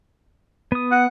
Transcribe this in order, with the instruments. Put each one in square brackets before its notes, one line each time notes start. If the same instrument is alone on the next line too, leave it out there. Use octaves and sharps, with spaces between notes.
[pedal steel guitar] B3 D#6
[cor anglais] F#5